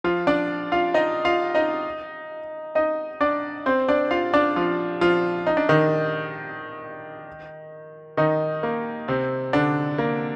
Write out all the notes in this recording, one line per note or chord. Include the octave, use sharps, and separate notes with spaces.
F3 F4
D4 D5
F4 F5
D#4 D#5
F4 F5
D#4 D#5
D#4 D#5
D4 D5
C4 C5
D4 D5
F4 F5
D4 D5
F3 F4
F3 F4
D#4
D4
D#3 D#4
D#3 D#4
A#3
C3 C4
D3 D4
A#3